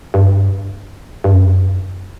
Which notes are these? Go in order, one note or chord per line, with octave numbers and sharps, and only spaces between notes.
G2
G2
F#2